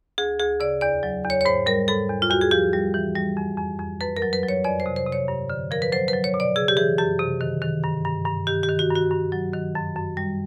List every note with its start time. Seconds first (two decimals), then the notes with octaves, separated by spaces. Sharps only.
0.18 D2 G#4
0.39 D2 G#4
0.60 C#3 D5
0.81 E2 D5
1.03 F#3
1.24 E2
1.30 C#5
1.41 C#5
1.45 G#2 C5
1.66 G3 A#4
1.88 G#2 A4
2.09 E2
2.22 F4
2.30 E2 F#4
2.41 G#4
2.51 F3 G4
2.73 G3
2.94 E3
3.16 G3
3.37 F2
3.58 F2
3.79 F2
4.01 F#2 B4
4.17 A#4
4.22 F#3
4.33 B4
4.43 F#3
4.49 C#5
4.64 F2 D5
4.80 C5
4.86 C3
4.96 C5
5.06 C3
5.12 C#5
5.28 G2
5.50 D3
5.71 F3 A#4
5.82 B4
5.92 F#3 C5
6.08 B4
6.13 F#3
6.24 C#5
6.34 B2
6.40 D5
6.56 C#3 G#4
6.68 G4
6.77 E3 G#4
6.98 F#2 G4
7.20 C3
7.41 D#3
7.62 D#3
7.83 G2
8.05 G2
8.26 G2
8.47 D#3 G4
8.63 G4
8.68 D#3
8.79 F#4
8.90 G2
8.95 F#4
9.11 G2
9.32 F#3
9.54 D#3
9.75 F#2
9.96 F#2
10.17 G3